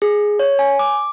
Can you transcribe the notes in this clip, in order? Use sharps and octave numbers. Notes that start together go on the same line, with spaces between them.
G#4
C#5
G#5
D6